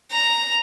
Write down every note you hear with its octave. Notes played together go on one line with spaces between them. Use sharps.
A#5